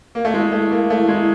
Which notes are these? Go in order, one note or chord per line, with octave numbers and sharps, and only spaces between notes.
A#3
A3
G#3 E4
A3
A#3
A3
G#3